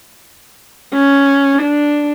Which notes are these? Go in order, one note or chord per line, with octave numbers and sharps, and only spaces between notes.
C#4
D4